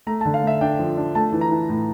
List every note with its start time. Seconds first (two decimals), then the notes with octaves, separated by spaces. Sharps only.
0.07 A3 A#5
0.21 A5
0.25 D3
0.34 F5
0.43 A3 E5
0.61 D4 G5
0.79 F3
0.97 D4
1.15 A3 A5
1.32 E3
1.41 A#5
1.51 E3
1.69 A2